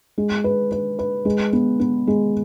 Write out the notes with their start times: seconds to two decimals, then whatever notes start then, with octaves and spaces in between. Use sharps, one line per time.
0.18 G#3
0.44 B4
0.72 B4
0.99 B4
1.25 G#3
1.53 B3
1.80 B3
2.07 G#3